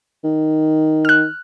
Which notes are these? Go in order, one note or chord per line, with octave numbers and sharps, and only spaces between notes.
D#3
F6 F#6